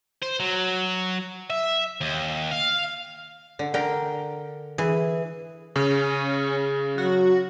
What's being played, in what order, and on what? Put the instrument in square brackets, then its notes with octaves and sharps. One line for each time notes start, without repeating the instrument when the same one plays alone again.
[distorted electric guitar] C5
F#3
E5
D#2
F5
[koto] D3
[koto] D3 A#4 [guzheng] G5
[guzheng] E3 [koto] G#4
[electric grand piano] C#3 [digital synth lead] C#4
[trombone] F#3 [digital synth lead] F#4